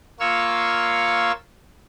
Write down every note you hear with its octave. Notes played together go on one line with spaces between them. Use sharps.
A#3 F4 C#5 F5 C#6 E6